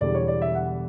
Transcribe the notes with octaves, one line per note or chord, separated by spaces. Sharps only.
E1 E2 D3 G3 D5
C#5
D5
E5
F#5